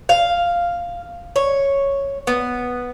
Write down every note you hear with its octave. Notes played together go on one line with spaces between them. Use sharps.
F5
C#5
B3